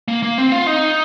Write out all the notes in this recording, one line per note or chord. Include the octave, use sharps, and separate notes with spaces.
A#3
A#3
C4
F4
D#4